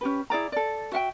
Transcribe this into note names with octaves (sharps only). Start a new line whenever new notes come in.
C#4 G4 B4
E4 G#4 D5 A#5
A4 D5
F#4 E5 F#5 G5